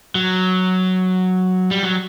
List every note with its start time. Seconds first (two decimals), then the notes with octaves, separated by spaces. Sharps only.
0.15 F#3
1.71 G3
1.83 F#3